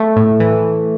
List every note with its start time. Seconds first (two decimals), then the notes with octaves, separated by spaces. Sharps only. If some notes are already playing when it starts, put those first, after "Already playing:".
Already playing: A3
0.16 A2
0.40 E3